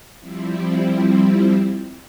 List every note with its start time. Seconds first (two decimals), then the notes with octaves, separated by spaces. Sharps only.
0.20 F3 G3 C4 E4